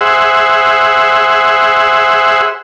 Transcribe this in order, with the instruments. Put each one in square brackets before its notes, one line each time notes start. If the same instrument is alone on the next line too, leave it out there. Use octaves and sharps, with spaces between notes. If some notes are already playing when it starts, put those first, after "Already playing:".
[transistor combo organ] G#4 C5 E5 F#5